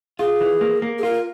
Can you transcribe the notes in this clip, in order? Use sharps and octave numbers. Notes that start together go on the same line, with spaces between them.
F4 G#4
E3
A#3
A#3
G#4
F4 A#4